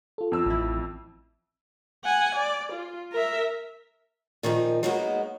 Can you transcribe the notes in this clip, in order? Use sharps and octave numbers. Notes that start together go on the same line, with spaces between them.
F4 A4
F2 E6
A1 E4
F#5 G#5
D5
F4
A#4 E5
A#2 D#3 F3 D#4
F#3 G#3 A#3 B3 D#4 F#4